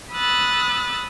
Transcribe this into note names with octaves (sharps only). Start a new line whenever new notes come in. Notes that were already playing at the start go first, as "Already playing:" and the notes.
B5 D#6 E6 F#6 A6